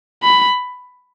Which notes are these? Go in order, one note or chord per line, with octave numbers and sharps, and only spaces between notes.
B5